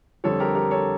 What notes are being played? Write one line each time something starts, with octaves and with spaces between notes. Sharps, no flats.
F2 D3 G3 A4 C#5
G4 A#4
G4 A#4
A4 C#5